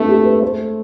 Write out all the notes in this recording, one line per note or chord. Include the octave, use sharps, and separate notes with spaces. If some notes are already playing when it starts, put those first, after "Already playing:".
Already playing: A3 B3 C4 D4 F4
G4
B4
A3 C5